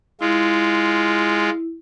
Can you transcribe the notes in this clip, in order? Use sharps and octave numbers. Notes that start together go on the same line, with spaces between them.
G#3 E4 F4